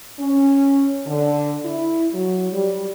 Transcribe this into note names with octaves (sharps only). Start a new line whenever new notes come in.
C#4
D3
E4
F#3
G3